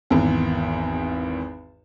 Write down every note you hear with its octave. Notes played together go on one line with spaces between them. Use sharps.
G#1 E2